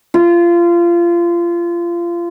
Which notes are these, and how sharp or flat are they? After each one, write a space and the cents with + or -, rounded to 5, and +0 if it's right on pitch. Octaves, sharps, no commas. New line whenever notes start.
F4 -25